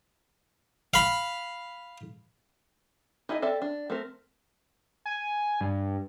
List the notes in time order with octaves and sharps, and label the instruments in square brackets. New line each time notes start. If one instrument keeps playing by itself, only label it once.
[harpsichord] F5 B5
[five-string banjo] D#4 E4 G#4 D#5
C4 A4 D5 E5
D4
A3 C4 A#4
[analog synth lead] G#5
G2